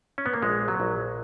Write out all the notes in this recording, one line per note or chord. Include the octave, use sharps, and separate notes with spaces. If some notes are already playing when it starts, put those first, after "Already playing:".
C#4
B3
A#3
A#1 G#3
F#3
A#1